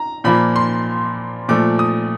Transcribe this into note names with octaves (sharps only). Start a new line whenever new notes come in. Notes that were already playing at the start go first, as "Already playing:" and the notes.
Already playing: A#5
A#2 F3 A#3 B5
C6
A#2 F3 A3 D6
D#6